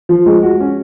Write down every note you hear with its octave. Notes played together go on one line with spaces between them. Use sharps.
F3
G#3
F#4
C#4